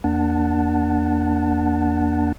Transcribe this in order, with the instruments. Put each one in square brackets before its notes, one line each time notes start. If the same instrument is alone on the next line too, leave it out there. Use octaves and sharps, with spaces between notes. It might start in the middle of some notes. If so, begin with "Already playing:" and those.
[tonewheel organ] E2 A#3 D4 F#5 A5